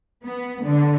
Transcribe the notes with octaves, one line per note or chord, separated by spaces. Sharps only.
B3
D3